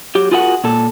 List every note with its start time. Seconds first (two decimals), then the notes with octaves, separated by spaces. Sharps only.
0.15 F#3 G4
0.31 F4 F#4 G#4 A#4 D#5 F#5
0.64 A#2 A4